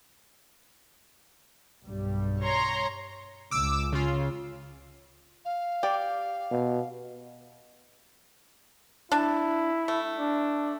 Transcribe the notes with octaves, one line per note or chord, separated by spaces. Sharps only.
B1 G2 G3
C#5 A#5 C6
C#2 D6 E6
C#3 F4
F5
G4 D5
B2
D4 E4 A5
A3
D4